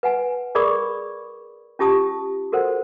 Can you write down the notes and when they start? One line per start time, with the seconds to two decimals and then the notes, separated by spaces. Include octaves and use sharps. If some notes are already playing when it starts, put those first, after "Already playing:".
0.03 B4 F#5 G#5
0.55 G#4 A#4 D5 B5 C#6 D#6
1.79 C#4 F4 G4 A5 D#6
2.52 F#4 A4 A#4 C5 F#5